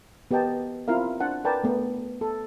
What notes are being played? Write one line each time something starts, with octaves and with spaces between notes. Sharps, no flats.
B3 G4 A#4 D#5 G5 A5
C4 E4 F4 A#4 F5
D4 C5 F#5 A5
A#4 B4 D5 G5 A5
A3 B3 A#4
A4